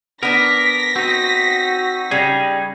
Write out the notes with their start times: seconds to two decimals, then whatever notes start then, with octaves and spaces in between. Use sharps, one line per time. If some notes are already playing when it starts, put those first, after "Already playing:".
0.23 B3 D4 A#4 A#6 B6
0.96 C4 D#4 F#4
2.11 C#3 G3 D#4 G#4